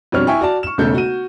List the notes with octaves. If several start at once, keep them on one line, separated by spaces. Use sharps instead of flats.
F2 B2 G3 D4 C#5 F6
E4 E5 G5 G#5 C#6
F#4 D5 A5
C#6 E7
E1 B1 C#3 A3 A4 G6
F#4 D#7